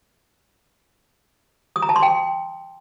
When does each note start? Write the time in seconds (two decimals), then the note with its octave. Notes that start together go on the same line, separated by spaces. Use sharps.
1.76 D#6
1.82 A#5
1.89 A5
1.96 C6
2.02 G5